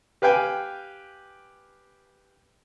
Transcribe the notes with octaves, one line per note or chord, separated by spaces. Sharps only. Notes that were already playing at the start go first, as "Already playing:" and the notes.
G4 B4 F5 G5 G#5